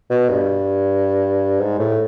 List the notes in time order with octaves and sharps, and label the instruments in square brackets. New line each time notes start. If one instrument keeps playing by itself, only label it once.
[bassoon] B2
G2
G#2
A2